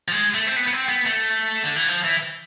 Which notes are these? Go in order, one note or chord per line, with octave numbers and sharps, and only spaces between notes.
F3
G#3
A3
C4
B3
B3
C4
B3
A3
D3
E3
F3
E3